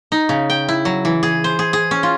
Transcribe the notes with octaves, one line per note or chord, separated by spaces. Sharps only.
D#4
C#3
G5
E4
F#3
E3
G#4
C5
G#4
G#4
C#4
F4